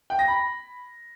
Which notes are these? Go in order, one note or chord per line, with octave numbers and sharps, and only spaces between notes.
G5
A#6
B5